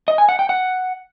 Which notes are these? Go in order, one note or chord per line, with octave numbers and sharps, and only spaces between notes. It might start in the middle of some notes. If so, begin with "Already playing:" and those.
D#5
G#5
F#5
G5
F#5